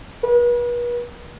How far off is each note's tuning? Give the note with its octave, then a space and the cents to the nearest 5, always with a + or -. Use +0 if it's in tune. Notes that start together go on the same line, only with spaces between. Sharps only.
B4 -40